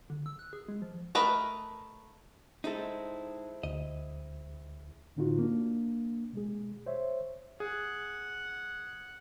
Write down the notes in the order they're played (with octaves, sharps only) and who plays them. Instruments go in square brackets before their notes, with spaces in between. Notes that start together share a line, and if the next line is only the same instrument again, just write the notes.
[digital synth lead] D3
E6
F#6
G#4
G#3
F3
[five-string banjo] A3 A#4 B4 D#5
[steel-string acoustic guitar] G#3 C4 E4 [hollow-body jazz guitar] D#4 A4
[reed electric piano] D2 [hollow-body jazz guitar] D#5
[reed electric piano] A2 D3 C4 D#4 F4 F#4
A#3 D4
B2 G#3 G#4
C5 C#5 E5
[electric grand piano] G#4 [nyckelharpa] F#5